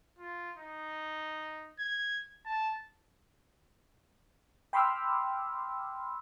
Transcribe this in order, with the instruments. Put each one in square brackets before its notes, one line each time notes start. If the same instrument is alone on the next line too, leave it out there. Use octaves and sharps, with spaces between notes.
[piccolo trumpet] F4
D#4
G#6
A5
[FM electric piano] G5 B5 C6 D6 E6 F6